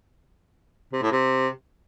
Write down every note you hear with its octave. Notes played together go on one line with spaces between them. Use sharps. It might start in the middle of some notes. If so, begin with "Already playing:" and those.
C3
A2
C3